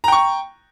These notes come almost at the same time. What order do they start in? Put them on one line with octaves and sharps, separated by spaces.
A#5 G5 C#6